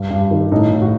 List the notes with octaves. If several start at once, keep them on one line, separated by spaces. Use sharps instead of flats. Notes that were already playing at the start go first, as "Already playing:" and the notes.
Already playing: G2
G2
D#3
A2 D#4
A2
F#4